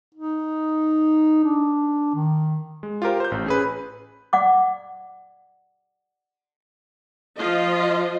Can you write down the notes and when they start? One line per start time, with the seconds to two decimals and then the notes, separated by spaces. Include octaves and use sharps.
0.15 D#4
1.44 D4
2.14 D#3
2.83 G#3
3.02 F4 G4 A#4 C5
3.20 C5 G6
3.32 A1
3.46 C#4 G#4 B4
4.33 D5 F#5 D6
7.38 F3 F4 D#5